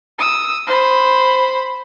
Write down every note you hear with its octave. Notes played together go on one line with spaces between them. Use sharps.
D#6 E6
C5 B5